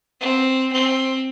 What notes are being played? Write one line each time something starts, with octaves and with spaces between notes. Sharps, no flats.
C4
C4